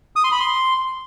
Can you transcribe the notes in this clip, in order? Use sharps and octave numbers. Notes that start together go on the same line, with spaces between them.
D#6
C6
B5
C6